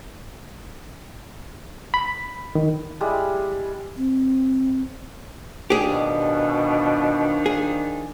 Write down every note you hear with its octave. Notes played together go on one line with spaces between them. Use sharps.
B5
D#3
G3 G#3 E4
C4
D#3 F3 D4 G4 G#4
B2
G#4